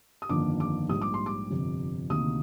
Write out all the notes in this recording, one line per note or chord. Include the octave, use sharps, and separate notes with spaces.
D#6
G1 F2 D#3 A#3 D4 D6
D6
A#1 G#2 G3 D#6
D6
C6
D6
G1 F2 C3
D2 C3 D#3 A#3 D#6